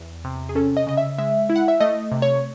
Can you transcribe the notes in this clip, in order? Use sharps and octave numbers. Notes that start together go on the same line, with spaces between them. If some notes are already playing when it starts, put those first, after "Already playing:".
Already playing: E2
C3
G#4
C#4 A4
D#5
C#3 D#5
E5
G#3 E5
E4
F#5
E5
A3 D#5
C3
C#5